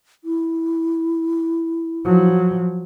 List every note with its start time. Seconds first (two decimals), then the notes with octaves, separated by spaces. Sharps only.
0.24 E4
2.05 F3 F#3